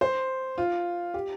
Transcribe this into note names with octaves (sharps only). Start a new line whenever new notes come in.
C5
F4
G4